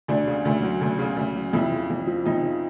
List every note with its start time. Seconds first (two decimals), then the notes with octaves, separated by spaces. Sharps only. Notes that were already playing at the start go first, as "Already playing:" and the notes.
0.08 D2 D4
0.27 C#3
0.45 D2
0.62 F#3
0.81 D2
0.99 C#3
1.17 D2
1.35 F#3
1.53 F2 E4
1.72 C#3
1.90 F2
2.07 F3
2.26 F2 D#4
2.43 C#3